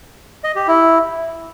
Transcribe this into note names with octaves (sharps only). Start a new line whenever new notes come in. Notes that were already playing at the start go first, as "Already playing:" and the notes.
D#5
G4
E4